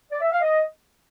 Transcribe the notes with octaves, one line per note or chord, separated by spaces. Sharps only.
D5
E5
F5
D#5